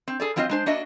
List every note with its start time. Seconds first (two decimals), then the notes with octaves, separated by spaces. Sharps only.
0.08 C4
0.20 G#4 A4 D5
0.36 F3 F#3 C4 F4 D#5
0.49 G#3 D4 C5
0.66 A#3 D4 F#4 D#5 E5